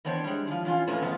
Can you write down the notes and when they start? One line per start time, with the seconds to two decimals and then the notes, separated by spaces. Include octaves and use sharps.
0.05 E3 B3 C4 D4 C#5
0.24 G3 G#3
0.47 E3 F3
0.65 E3 C#4 F4
0.87 F2 A#2 A3 C#4 B4
1.02 F#2 A2 C#3 F3 B3